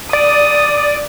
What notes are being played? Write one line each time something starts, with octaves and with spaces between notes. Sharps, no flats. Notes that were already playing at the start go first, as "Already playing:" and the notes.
D5 D#6